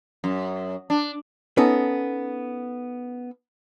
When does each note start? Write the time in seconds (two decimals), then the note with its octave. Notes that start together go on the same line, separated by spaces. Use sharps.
0.24 F#2
0.90 D4
1.57 B3 C#4 D#4 A4